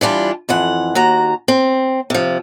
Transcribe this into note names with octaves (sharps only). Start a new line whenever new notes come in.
E3 G3 D4 F4
F2 E3 F#5
D#2 F#4 A#5
C4
C3 F3